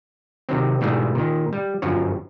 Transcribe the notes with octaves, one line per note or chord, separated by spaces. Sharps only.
C3 D#3 F#3 C4
G#2 B2 E3 G3 A3 G#4
A#2 D#3
G3
G1 F#2 F3 F#4 C#5